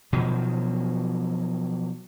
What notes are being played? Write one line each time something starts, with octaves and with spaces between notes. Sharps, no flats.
B2 D#3 F3 F#3